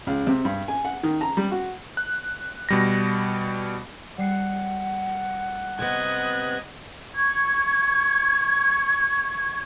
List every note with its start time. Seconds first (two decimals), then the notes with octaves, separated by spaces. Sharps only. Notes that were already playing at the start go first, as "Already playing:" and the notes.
0.07 C#2
0.27 C3
0.45 G2
0.68 G#5
0.85 F#5
1.03 D#3
1.21 A#5
1.37 G3
1.51 F#4
1.97 F#6
2.69 B2 G3 A#6
4.18 G3 F#5 C7 C#7
5.79 C3 B3 D#5 F#6 G#6
7.14 C#6 G#6